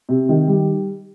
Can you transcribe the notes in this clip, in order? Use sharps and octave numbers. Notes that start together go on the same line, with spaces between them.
C3
D#3
G3